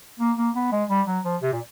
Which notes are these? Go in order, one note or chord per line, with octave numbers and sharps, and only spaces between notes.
A#3
A#3
B3
G#3
G3
F#3
F3
C3
A#2